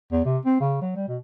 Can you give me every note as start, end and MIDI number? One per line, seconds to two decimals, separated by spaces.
0.12 0.20 40
0.25 0.38 48
0.45 0.55 60
0.61 0.78 49
0.81 0.92 54
0.96 1.08 55
1.08 1.17 47